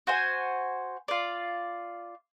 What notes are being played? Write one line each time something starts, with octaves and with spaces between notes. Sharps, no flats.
F#4 C5 G#5
F4 D5